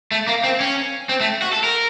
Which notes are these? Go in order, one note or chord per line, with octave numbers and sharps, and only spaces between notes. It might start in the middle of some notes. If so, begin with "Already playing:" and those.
A3
A#3
C4
C#4
C4
A3
F#4
A4
A#4